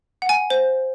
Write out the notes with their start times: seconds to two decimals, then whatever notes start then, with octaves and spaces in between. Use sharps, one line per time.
0.22 F#5
0.29 G#5
0.50 C5